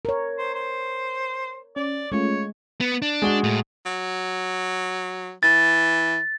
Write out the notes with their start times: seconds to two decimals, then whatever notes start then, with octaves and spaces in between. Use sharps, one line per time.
0.05 A#4 C#5
0.38 C5
0.54 C5
1.76 C#4 D5
2.12 G#3 A3 C#4 F4 C#5
2.81 B3
3.02 D4
3.22 G#3 F#4 G7
3.44 A2
3.86 F#3
5.43 E3 A6